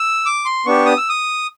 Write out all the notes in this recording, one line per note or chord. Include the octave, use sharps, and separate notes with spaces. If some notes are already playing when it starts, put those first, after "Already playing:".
Already playing: E6
D6
C6
B3 D4 G4 C#6
D#6
E6
D#6